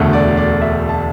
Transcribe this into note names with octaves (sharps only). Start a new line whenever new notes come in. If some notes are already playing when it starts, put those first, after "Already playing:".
Already playing: E1 D2 D3 A3
D5
D5
E5
A5